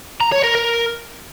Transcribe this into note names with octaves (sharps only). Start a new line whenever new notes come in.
A#5
C#5
A#4
A#4